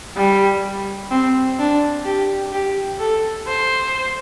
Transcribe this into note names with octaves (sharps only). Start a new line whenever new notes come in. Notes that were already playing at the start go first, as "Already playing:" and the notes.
G3
C4
D4
G4
G4
A4
C5